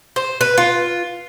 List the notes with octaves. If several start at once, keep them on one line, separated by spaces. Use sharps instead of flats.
C5
B4
F4